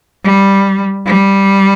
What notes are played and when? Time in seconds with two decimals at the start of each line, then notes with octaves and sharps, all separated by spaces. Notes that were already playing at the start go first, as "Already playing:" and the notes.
0.24 G3
1.06 G3